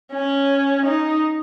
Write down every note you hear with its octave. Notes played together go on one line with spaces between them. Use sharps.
C#4
D#4